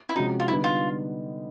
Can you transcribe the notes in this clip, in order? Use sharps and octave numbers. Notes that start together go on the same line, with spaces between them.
E4
C3 F3 G#3 C#4 D#4 F#4
F4
D3 G3 B3 D#4 E4
F4